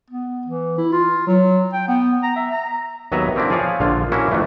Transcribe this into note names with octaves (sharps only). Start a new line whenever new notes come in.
B3
E3
E4
F4
F#3
G5
B3
A#5
E5
A#5
D#2 F#3 B3 B4 E5 A#5
A#3 C4 D4 E4
F3 G#4 C#5 D5 F5
A#1 D3 F4
A#3 C#4 E4 F#4
F2 D#3 E3 A3 D4